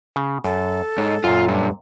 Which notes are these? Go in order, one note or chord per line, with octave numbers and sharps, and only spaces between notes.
C#3
F#2 A4
G#2 C#5 D#5
F#2 A#2 F4
G2